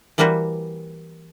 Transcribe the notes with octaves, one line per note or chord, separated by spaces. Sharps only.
E3 G3 A#3 F#4 B4 C5